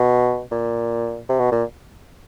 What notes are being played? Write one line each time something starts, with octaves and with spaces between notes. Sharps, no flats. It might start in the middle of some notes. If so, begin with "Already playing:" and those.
Already playing: B2
A#2
C3
B2
A#2